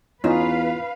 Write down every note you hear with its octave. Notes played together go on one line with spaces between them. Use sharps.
E2 C#4 D#4 F4 B4 F5